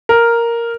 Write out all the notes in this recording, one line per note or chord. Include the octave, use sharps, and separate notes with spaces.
A#4